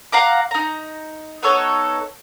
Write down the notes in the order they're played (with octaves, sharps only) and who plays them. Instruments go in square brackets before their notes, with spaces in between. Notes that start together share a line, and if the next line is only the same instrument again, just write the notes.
[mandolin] F5 F#5 A#5 D6
D#4 A#5
B3 D#4 A4 C#5